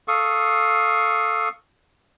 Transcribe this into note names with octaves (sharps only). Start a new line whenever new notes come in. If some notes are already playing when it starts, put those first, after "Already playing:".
A4 F5 C#6 D#6